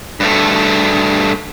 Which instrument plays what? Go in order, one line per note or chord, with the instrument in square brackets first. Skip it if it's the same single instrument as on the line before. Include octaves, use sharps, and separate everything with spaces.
[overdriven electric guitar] G2 A3